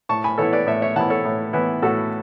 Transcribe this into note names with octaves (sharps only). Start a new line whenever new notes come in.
A2 A5 C#6
G#5 B5
E3 B3 E4 A4 C#5
B4 D5
A2 C#5 E5
C#5 E5
E3 B3 E4 F#5 A5
A4 C#5
A2
E3 B3 E4
A2 F#4 A4